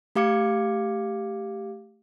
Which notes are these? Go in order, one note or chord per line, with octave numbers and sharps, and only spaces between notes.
A3 G4 F5 D6 G#6 C#7